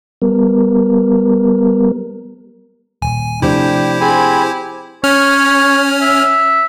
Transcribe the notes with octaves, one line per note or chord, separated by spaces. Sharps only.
G3 B3 A#4
D#1 G#5
C3 F3 A3 D4 E4 G4 C5 G5
C4 G#4 G#5 B5
C#4 C#5 F6
E5